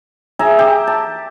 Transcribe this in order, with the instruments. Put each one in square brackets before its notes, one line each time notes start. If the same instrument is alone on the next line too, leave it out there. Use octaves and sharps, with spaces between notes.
[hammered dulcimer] G#4 E5 A#5
G4
A5